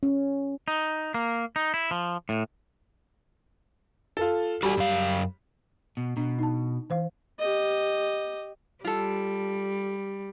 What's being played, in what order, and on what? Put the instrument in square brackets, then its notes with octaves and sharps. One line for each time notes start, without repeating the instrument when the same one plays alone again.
[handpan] C#4
[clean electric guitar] D#4
A#3
D#4
E4
F3
A2
[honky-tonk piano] F4 A4
[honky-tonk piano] G3 [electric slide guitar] F#4 A4 G#5
[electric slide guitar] F#2 F5
B2
[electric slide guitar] B2 [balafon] D4
[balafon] D#4 A5
E3 C5 F5
[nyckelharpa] G4 D#5
[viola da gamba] G3 [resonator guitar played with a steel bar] F4 A4